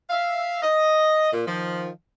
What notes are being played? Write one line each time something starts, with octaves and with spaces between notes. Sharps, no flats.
E5 F5
D#5
A#2
D#3 F3